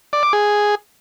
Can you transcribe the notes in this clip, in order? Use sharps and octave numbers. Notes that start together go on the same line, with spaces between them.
D5
D6
G#4